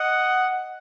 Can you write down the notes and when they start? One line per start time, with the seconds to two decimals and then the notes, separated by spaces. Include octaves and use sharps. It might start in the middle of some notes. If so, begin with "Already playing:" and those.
Already playing: D#5 F#5